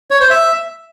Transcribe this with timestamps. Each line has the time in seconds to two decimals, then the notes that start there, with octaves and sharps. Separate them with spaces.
0.11 C#5
0.20 C5
0.30 E5